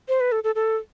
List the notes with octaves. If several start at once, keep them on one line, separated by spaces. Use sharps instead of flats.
C5
B4
A4
A4
A4